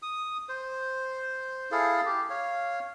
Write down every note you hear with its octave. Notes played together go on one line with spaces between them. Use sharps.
D#6
C5
E4 G#4 A4 F5
G4
C#5 F5